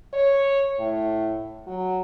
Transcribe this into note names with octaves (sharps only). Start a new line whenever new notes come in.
C#5
A2
F#3